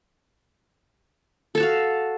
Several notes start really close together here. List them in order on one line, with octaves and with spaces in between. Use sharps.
A4 A5 F#4 F5